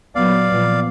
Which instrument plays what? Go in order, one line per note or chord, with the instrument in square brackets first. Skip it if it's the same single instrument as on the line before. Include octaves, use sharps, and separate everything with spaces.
[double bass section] A#2 F#3 B3 [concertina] D5 F5
[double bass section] A#2 F3 B3